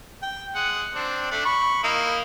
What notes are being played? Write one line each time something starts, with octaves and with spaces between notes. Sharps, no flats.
G5
G#3 F#5
C4 D4
A3 D4
B5 C#6
A#3 D#4 E4